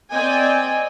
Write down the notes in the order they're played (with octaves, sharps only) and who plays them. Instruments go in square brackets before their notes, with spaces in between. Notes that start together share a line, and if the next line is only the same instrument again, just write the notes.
[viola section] C4 D5 D#5 G5 G#5